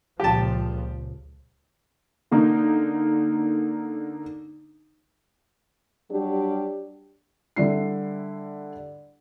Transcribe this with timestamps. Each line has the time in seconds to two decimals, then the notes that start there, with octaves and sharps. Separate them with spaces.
0.20 C#2 A#2 F3 G4 A5
2.31 D3 A#3 D#4
6.12 F#3 G3 D4 G4
7.56 D3 G3 E4 C7